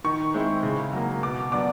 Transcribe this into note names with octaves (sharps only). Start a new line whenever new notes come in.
D#3 C#6
G#3 C4 E4
C#3
F#3 A#3
B2 D6
F#3 B3 D4 D6